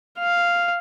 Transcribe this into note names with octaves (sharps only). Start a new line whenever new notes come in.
F5